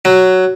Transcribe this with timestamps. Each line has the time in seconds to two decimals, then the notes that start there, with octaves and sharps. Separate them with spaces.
0.05 F#3